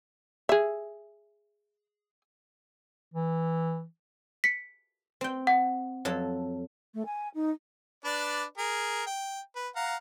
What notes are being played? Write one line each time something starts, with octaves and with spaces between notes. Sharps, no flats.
G#4 E5
E3
B6 C#7
C4 G5
F#5
F2 F#3 A4
A3
G#5
D#4
D4 B4 D5
G#4 A#4
G5
B4
F5 F#5 A#5